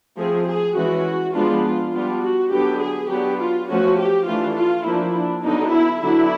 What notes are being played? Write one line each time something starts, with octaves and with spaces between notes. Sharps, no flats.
F3 A3 C4 G#4
G#4
E3 G#3 C#4 F#4
F3 G#3 B3 D4 F4
F4
G3 B3 D4 F4
F#4
D3 F#3 B3 D4 G4
G#4
F#3 B3 D4 G4
F4
F3 A3 C#4 F#4
G4
E3 A3 D4 F4
F4
F3 A#3 D4 E4
D4
D3 F#3 B3 D4 D#4
E4
D3 F#3 B3 D4 E4